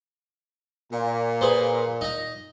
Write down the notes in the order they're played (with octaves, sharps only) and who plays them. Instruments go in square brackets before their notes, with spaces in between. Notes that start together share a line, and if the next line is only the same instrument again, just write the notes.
[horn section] A#2
[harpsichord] G#4 B4 C5
D#4 A#5